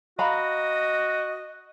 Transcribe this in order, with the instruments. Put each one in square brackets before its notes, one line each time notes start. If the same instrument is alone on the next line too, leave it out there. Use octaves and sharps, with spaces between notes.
[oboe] F#4 [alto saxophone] D#5 [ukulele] F5 A#5 B5